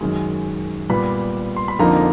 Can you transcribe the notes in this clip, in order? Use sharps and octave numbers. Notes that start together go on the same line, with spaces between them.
F#2 D#3 G#3
A#2 G3 B3 B5
C6
B5
F2 D3 F3 A#3 D#4 A#5